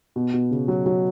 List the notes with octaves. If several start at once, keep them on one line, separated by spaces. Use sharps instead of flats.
B2
B2
C#3
F#3
F#3